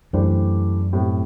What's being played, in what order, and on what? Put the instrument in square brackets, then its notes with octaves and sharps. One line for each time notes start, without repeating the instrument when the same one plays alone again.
[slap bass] F#2 [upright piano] E3 A3 D4 G4 C5
[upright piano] A2 G3 C4